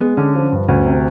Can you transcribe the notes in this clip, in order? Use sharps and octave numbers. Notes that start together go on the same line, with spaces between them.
G#3 B3
D3 C#4
F3
G2
D2 C#4
C3